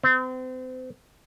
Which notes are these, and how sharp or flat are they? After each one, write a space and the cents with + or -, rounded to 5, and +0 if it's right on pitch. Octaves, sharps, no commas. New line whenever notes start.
C4 -35